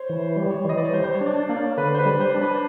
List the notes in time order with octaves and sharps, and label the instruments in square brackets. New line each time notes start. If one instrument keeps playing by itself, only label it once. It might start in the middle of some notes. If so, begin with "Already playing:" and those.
Already playing: [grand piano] C5 C#5
[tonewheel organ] E3
G3
[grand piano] C#5
[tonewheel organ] E3 [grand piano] D#5
[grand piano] D5
C#5
[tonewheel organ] G3 [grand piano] C5
[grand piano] C5
C#5
[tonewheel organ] D4
[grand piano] D5
C#5
[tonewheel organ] A#3 [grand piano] D5
[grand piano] C#5
[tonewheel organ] D3 [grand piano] B4
[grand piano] C5
B4
[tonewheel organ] G3
[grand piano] C5
[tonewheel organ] D4
[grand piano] B4